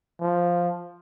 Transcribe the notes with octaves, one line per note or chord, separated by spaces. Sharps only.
F3